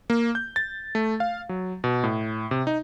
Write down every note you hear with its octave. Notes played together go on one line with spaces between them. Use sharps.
A#3
G6
A6
A3
F5
F#3
B2
A2
C3
D#4